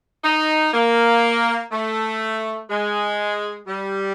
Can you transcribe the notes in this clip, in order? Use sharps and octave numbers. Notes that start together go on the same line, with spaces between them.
D#4
A#3
A3
G#3
G3